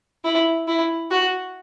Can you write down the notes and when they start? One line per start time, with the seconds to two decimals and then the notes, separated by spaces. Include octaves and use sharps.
0.25 E4
0.68 E4
1.11 F#4